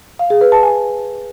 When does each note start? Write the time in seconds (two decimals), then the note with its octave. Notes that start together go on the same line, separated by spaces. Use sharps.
0.19 F5
0.30 G#4
0.41 B4
0.52 A5
0.63 G#5